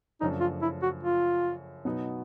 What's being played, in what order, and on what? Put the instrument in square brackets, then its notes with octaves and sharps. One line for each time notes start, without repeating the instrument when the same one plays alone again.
[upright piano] F#2 C#3 F3 A3 D4 [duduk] D#4
[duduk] F4
E4
F#4
F4
[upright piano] B2 F#3 B3 D#4 F#4